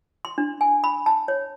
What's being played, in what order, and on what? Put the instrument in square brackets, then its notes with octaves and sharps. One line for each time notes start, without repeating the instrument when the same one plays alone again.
[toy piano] C6
D4
G#5
B5
A5
C#5